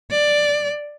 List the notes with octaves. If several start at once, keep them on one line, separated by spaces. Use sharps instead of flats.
D5